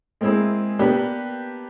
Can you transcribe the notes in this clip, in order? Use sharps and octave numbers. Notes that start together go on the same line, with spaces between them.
G#3 A#3 C4 E4 G#4
A#3 B3 D4 G4 B4